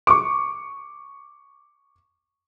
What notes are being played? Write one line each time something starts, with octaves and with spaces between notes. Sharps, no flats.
C#6 D6